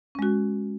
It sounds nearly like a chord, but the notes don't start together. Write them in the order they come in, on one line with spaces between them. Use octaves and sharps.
C#4 G#3 F#4